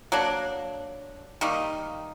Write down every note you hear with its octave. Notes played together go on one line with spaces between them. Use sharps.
F#3 A#3 D4
D#3 G3 A#3 D#4